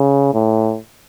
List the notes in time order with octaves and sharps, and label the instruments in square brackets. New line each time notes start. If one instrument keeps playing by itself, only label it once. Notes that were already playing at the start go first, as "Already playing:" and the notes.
Already playing: [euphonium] C#3
A2